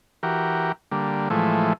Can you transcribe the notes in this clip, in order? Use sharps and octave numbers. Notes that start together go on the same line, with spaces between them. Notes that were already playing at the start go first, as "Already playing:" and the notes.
E3 F#4 G4 A#4
D3 G3 A#3
A2 E3 F3 G#3 A3